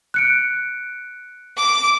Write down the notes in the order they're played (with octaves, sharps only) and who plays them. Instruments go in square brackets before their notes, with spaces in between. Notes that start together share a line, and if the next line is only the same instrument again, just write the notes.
[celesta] F#6 C#7 D7
[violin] D6